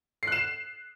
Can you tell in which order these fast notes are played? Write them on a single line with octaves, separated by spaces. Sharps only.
C7 F#6 E7